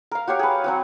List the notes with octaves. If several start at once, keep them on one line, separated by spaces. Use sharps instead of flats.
A#4 F5
F#4 G4 C#5 F5
G#4 B4
F#3 C4 F#4